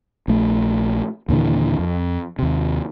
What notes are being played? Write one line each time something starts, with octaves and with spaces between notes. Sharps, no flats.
A#1 A3
D#2 A#2 D3 E3
F2
D#2 C3